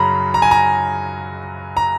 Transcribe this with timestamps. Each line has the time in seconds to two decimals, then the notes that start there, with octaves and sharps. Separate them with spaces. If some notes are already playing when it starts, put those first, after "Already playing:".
Already playing: F#2 C#3 F#3 A#5 B5
0.34 A#5
0.42 G#5
0.51 A#5
1.77 A#5